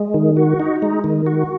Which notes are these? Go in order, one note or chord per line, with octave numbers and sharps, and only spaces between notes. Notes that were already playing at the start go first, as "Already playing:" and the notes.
Already playing: G#3
D#3
F#4
D#4
G#3
D#3
F#4